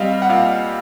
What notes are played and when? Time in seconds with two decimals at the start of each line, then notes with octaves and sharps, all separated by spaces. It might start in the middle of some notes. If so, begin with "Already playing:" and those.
Already playing: G3 C4 D#5 F5
0.22 F#5
0.29 A#2 F5